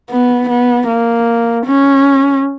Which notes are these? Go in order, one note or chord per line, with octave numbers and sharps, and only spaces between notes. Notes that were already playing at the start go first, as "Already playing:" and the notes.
B3
B3
A#3
C#4